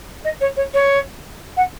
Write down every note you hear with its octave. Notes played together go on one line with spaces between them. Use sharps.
D#5
C#5
C#5
C#5
F#5